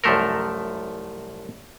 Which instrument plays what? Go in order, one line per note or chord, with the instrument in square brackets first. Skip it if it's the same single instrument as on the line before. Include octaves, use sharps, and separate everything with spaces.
[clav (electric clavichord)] C2 F#2 F3 A3 A4 A#4